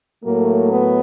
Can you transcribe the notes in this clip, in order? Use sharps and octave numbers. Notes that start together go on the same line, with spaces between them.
A2 F#3 A3 A#3
B3